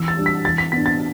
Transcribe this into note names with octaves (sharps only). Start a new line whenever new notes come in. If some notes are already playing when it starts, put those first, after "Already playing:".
Already playing: E3 E6
A6
G3 D4
B6
E3 A6
B6
B3 D4 B6
A6